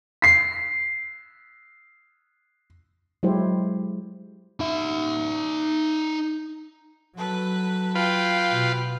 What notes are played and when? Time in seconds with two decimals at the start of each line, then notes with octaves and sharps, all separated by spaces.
0.22 B6 C7
3.23 F#3 G#3 E4 G4 C5
4.60 D#4 E5
7.17 F#3 A4 B4
7.95 F4 B4 F5 G5
8.50 B2